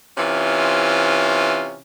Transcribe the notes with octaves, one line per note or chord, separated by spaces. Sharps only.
C3 E3 C#4 F4